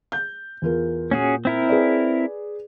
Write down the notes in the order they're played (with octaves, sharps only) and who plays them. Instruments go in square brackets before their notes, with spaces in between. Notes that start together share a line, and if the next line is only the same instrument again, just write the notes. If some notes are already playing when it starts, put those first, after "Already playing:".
[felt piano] G6
E2 F4 A#4
[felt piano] A#2 [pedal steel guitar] C#4 F#4 G#4
[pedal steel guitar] C4 E4 A#4
[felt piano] G#4 B4 D5